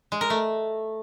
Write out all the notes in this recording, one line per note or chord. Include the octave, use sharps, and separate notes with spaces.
G#3
A#4
A3